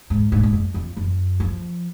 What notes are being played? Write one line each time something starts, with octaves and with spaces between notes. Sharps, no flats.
G#2
G#2
G#2
F#2
F2
F#2
F3